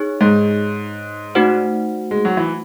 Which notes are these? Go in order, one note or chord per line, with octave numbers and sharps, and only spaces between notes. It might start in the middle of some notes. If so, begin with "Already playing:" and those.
Already playing: D#4 G#4 C#5
G#2
A3 D#4 F#4 C5 F#5
G#3
F#3
E3